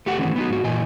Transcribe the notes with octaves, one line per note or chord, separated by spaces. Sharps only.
A3 G4 F#5
D#3 E3 A3 C4 C#4
B3 D#4 F#4
G#2 F#4
A#2 E3 D#5 G#5